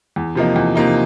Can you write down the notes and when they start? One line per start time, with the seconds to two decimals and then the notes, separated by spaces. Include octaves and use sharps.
0.16 E2
0.35 C3 F3 A#3 D#4
0.56 E2
0.75 C3 F3 A#3 D#4